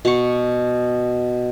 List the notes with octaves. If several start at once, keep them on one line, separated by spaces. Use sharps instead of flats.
B2 C#6